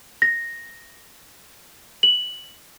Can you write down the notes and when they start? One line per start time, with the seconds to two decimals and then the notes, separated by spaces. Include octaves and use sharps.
0.22 A#6
2.03 F#7